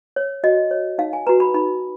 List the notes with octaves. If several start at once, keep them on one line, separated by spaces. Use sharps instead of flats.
C#5
F#4 D#5
C#5
D#4 F5
G#5
F#4 B4 A#5
B5
D#4 B5